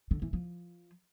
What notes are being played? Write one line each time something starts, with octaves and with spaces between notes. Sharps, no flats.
D3
E3
F3